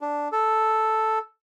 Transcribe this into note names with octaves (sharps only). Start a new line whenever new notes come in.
D4
A4